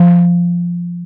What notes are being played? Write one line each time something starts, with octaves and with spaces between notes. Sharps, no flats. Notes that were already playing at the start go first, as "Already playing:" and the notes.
Already playing: F3